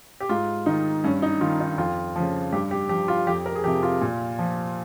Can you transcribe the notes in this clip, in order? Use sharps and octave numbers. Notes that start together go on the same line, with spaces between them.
G4
G#2 F4
D#3 D#4
G2 C#4
D#4
D#3 F4
D#4
F2 F4
C#3 F3
G2 G4
G4
F3 G4
F4
F2 G4
A#4
G#4
C3 F3 G4
F4
A#2
F3